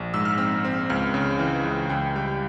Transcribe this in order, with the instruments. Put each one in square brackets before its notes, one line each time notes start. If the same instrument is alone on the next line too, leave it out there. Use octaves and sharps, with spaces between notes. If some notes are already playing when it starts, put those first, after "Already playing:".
Already playing: [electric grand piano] A#1
G#2 E6
F6
C4 E6
C4
C#2 F6
C#3
E3
C#2
C#2 G5
G3 G5